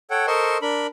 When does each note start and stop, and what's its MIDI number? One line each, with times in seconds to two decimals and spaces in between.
0.10 0.26 69
0.10 0.26 73
0.10 0.26 78
0.10 0.26 79
0.27 0.58 69
0.27 0.58 70
0.27 0.58 72
0.27 0.58 75
0.27 0.58 84
0.27 0.58 85
0.62 0.87 62
0.62 0.87 70
0.62 0.87 83